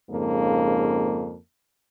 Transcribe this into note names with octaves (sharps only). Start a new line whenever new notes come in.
F2 G#2 C#3 A#3